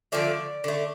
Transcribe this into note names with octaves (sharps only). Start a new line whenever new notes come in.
D3 F3 A3 D5
D3 A3